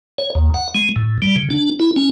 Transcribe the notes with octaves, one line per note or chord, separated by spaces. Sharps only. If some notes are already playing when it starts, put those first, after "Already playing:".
C#5
D#2
F#5
G#3
A2
G3
C#3
D4
E4
C#4